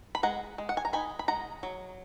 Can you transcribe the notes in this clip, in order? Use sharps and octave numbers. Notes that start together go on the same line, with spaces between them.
B5
G#3 F#5 A#5
G#3
F#5
G#5
A#5
D#4 G#5 B5
B5
G#3 F#5 A#5
F#3